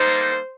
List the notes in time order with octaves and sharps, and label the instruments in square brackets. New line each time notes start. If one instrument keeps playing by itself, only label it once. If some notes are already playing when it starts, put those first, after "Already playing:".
Already playing: [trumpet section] G3 A#3 D#4 A4 [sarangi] C5